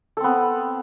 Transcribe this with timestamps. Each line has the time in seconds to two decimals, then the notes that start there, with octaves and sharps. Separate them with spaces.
0.17 A4
0.20 C4
0.24 B3